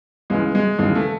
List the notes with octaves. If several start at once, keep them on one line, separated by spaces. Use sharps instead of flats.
C#2 C#3 E3 G#3
G#3
D#2 C#3 E3 G#3
A3